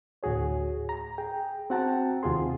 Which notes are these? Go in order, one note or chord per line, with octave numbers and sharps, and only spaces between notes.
D2 A2 F#4 G#4 C#5
A#5
G#4 G5
C4 F#4 F#5 G5 A5 A#5
D#2 C3 F4 G#4 C6